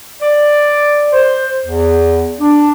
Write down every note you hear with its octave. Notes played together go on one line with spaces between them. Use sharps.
D5
C5
E2
D4